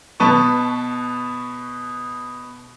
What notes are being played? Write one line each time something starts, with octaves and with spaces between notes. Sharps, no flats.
B2 B4 A5 C#6